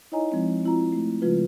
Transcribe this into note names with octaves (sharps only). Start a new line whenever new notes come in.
D#4 E4 C#5 D#5 G#5 A#5
F3 G#3 C4
C4 E4 F4 A#5
A3
C#3 F3 G#3 F4 B4